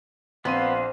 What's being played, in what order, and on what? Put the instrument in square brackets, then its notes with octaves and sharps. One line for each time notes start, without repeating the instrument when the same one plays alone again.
[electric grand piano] A#1 C6 D#7 [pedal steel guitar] B3 [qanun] C4 [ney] F5